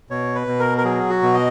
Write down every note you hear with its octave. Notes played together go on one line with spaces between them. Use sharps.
B2 C#5
B4
B2
A#4
A#4
F#3 G#4
F#4
B2
D#5